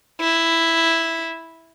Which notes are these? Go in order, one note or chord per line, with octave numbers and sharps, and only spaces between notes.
E4